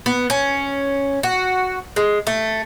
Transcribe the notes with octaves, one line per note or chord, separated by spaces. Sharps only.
B3
C#4
F#4
G#3
A3